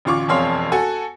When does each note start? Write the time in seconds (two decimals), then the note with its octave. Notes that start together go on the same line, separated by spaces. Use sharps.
0.05 A1 D2 F4 C#6 D6
0.28 E1 F2 G#4 C#5 F5 C6
0.72 F#4 A4 G#5